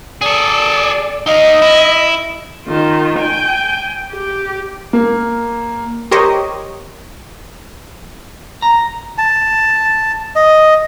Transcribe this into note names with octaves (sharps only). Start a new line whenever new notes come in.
G#4 A4 D5
D#4 D#5 F5
E4
D#3 F4
G5 G#5
G4
A#3
G4 A#4 C5 C#5 D#5
A#5
A5
D#5